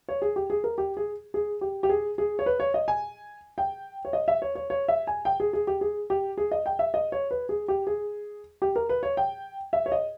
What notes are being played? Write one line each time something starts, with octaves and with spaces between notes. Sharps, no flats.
C#5
G#4
G4
G#4
A#4
G4
G#4
G#4
G4
G4
G#4
G#4
C#5
B4
C#5
D#5
G#5
G5
C#5
D#5
E5
C#5
C#5
C#5
E5
G#5
G5
G#4
G#4
G4
G#4
G4
G#4
D#5
G5
E5
D#5
C#5
B4
G#4
G4
G#4
G4
A#4
B4
C#5
G5
E5
C#5
D#5